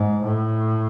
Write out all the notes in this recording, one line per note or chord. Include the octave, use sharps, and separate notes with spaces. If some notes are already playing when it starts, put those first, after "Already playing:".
Already playing: G#2
A2